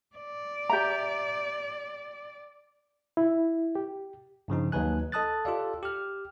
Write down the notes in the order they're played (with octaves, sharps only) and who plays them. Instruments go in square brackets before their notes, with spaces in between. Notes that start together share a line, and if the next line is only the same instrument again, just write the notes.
[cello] D5
[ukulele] G4 E5 A#5
[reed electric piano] E4
G4
[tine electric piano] G2 C#3 F3 D#4
D#2 F#3 D#4 B4 G#5 F#6
A4 D#5 A5 D#6 F#6 A6
F4 G4 A4 D5 F5
G4 F6